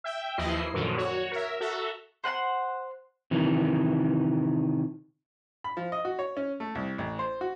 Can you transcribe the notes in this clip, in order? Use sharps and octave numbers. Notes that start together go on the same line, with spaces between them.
E5 G5
D#2 E3 F3 E4 D#5 C7
F#2 A#2 D3 D#3 F3 F#3
F#4 C#5
A#4 E5
F#4 A4 E5 A#5
C5 F#5 G#5 C6
C3 D#3 E3
B5
F3
D#5
F#4
C#5
C#4
A3
C2
A1
C5
F#4